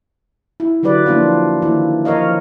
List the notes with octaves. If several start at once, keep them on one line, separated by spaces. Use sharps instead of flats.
E4
D3 F#3 G4 B4 D5
F3 A#3 D4 E4 F4
D#3 A#3 E4
F3 A#4 C#5 D#5 F5